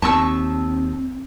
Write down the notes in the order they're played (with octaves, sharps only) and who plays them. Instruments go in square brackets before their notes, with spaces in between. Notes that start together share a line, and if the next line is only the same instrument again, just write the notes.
[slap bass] D#2 [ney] C4 [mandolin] A5 C#6 E6